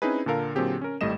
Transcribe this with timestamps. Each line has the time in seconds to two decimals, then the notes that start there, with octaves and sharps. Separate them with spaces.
0.02 C4 C#4 D#4 E4 G#4 B4
0.26 A#2 D3 A4 A#4 F5
0.55 A#2 D3 F#3 C4 G4 G#4
0.81 C#4 A#4
1.01 G#1 A2 G3 A3 D#5 E7